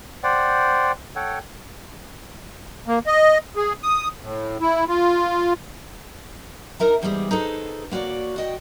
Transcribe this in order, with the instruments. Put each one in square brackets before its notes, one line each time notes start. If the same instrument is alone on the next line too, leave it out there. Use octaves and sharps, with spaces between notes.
[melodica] C5 D5 F#5 G5
A4 C#5 F#5 G5
[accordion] A#3
D#5
G#4
D#6
A2
E4
F4
[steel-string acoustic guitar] D#4 A#4 E5 A#5
E2 G#2 G3 G4 G#4
D#4 G#4 A4 B4 C5
A#3 F#4 C#5 D5
F#4 D#5 G5